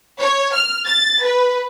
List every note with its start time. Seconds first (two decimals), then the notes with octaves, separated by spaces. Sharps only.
0.21 C#5
0.54 F6
0.86 A6
1.24 B4